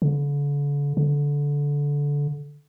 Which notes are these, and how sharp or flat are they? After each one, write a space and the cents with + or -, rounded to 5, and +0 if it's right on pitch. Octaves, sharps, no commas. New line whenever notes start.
D3 -40
D3 -20